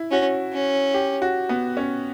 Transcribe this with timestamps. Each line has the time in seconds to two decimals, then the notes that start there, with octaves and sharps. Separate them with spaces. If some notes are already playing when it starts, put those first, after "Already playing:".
Already playing: E4
0.11 C#4 F#4
0.53 C#4
0.94 G4
1.22 F#4
1.49 B3
1.77 C#4